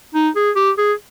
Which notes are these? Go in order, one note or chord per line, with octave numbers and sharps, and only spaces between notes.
D#4
G#4
G4
G#4